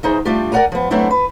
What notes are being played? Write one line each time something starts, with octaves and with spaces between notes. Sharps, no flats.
E2 D#4 G#4 C5
G3 A3 D4 F4 G4
A#4 D5 D#5 F#5 G#5 A#5
F3 B3
F#3 A3 B3 C4 D4 E4
B4